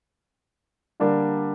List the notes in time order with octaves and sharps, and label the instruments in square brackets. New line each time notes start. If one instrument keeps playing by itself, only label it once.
[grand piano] D3 G3 A#3 D4